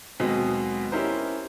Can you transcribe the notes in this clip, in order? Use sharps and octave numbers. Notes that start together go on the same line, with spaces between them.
D#2 B2 F#3 G#3 B3 C4
C#4 D#4 E4 G4 A#4 C5